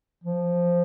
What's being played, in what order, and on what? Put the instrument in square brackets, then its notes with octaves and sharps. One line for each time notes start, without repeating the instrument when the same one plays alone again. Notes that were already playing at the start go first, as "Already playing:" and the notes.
[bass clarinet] F3